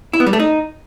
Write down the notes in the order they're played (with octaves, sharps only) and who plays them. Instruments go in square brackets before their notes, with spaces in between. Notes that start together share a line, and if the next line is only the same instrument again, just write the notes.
[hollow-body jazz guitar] E4
B3
G3
A3
D#4